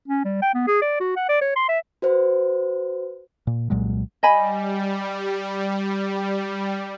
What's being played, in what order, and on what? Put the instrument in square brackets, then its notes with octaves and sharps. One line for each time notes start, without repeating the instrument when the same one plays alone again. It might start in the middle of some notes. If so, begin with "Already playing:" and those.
[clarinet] C#4
G3
G5
B3
G#4
D5
F#4
F#5
D5
C#5
C6
E5
[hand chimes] F#4 B4 C5
[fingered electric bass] A#2
C2 A#2 F#3 G#3
[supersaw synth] G3 [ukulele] D#5 G#5 B5